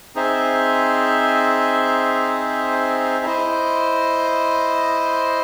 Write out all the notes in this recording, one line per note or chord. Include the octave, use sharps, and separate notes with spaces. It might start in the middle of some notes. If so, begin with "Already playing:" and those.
C4 D#4 G#4 C5 E5
E4 C5 D#5